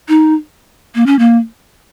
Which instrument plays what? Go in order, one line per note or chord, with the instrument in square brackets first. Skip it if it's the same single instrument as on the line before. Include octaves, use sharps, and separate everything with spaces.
[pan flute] D#4
A#3
C#4
A#3